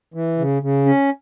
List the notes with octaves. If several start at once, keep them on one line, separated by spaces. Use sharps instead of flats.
E3
C#3
C#3
C#4